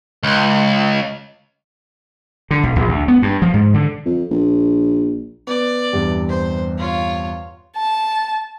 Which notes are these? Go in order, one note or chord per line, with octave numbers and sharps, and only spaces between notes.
C#2
D3
B1
A#1
D2
B3
G2
F3
G#2
D3
F2
A#1
B3 D5
E2 G2 C3
C5
F4 C#5
A5